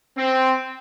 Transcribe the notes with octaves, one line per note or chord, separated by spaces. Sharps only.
C4